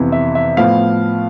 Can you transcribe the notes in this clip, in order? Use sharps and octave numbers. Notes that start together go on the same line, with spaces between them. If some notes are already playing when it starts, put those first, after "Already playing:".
Already playing: F2 C3 E3 B3
E5
E5
A2 F3 B3 F5